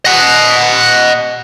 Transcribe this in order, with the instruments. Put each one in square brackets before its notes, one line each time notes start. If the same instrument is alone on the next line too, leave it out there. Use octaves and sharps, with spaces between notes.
[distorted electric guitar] D#5 F#5